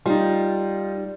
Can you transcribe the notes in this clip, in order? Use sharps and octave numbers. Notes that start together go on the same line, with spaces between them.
G3 D#4 F4